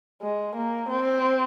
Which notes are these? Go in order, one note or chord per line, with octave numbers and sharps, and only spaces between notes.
G#3
A#3
C4